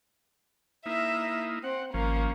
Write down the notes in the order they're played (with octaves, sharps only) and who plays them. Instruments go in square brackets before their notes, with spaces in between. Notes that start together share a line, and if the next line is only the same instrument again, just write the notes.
[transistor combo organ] A#3 D#4 E4 [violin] E5
[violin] C4 [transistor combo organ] F#5
[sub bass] G#1 [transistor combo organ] F3 C#4 [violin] A#3